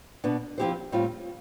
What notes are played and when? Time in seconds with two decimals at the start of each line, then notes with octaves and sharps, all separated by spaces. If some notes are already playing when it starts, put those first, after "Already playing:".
0.24 B2 B3 D4
0.58 F3 C4 E4 G4 C5
0.92 A2 G3 C4 F4